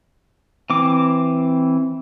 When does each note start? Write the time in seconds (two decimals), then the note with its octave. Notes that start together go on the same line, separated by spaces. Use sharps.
0.70 E3 C4 D6